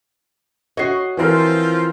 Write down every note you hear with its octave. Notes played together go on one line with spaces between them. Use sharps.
F#4 C#5 D#5 C7
E3 F3 C4 F4 A#4